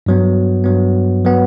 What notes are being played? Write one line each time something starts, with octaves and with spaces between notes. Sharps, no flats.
G2 F#3 B3
G2 F#3 B3
F#3 B3